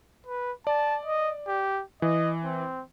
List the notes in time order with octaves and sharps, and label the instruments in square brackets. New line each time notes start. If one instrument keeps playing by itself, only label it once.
[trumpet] B4
[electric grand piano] D5 [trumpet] A5
[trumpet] D#5
G4
[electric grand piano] E3 [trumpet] D#5
[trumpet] C4